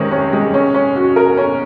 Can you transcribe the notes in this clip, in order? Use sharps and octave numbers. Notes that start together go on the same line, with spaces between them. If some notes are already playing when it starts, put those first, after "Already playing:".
Already playing: C3 D#3 G#3 C#4
C#4
G#3
C#4
C#4
F#4
A#4
C#4